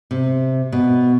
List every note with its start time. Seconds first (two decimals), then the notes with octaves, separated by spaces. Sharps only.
0.11 C3
0.72 B2